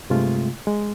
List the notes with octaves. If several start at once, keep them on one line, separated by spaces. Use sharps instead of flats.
G2 C3 G#3 A3 F4
G#3